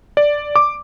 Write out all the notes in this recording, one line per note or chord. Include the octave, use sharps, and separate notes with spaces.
D5
D6